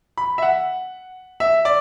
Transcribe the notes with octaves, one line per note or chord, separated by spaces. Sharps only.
B5
E5
F#5
E5
D5